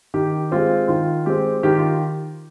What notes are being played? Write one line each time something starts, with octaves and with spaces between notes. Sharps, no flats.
D#3 G4
G#3 C4 F4
D#3 F4
G#3 C4 G4
D#3 G4
F4